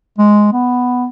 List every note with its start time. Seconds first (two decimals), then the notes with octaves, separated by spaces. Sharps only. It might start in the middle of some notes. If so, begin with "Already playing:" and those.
0.18 G#3
0.53 B3